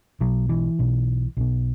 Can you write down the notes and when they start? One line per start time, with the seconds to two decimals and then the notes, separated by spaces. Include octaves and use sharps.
0.20 B1 B2 F#3
0.49 E3
0.79 B1 B2
1.37 B1 B2